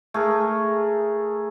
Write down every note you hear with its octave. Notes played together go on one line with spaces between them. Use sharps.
A3 G#4 A#4